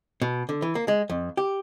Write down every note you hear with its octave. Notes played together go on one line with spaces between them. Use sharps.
B2
D3
E3
A#3
G#3
F2
G4